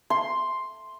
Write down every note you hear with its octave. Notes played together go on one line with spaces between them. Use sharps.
C6